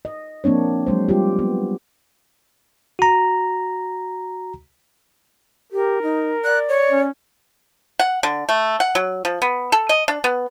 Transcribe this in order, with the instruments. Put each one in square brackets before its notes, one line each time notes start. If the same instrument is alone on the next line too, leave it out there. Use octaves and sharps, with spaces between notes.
[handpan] D#5
F3 A#3 C4 D4 C#5
F#3 G#3 C5
G3 F4 G4
B3
[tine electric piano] F#4 A#5
[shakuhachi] G4 [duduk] A#4
[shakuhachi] D#4
[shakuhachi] D5 [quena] F#6
[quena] C#5
[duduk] C#4
[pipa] F#5
D3
A3
F#5
F#3
F3
B3
A4
D#5
D4
B3